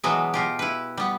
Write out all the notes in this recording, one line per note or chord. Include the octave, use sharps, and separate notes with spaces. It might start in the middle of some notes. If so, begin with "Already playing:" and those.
B2 E3 F#3 G#3 B3
B2 F4 G4
E4 B4
G3 B3